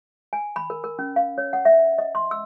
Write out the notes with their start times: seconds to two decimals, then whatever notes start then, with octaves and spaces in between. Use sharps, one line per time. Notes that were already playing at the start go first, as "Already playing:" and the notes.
0.33 G#5
0.56 B5
0.70 A#4
0.84 A#4
0.99 C#4
1.16 F5
1.38 C#5
1.53 F#5
1.65 E5
1.98 D#5
2.15 C6
2.31 E6